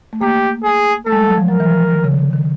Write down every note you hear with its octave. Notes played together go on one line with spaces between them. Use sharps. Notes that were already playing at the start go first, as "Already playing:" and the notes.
A3
A#3 G4
G#4
A3 A4
G#3
G3
F#3
F3
F#3 A#4
E3
F3
D#3
C#3
D3
D#3